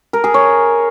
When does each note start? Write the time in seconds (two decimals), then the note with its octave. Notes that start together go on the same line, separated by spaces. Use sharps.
0.13 A#4
0.24 G#4
0.34 C#5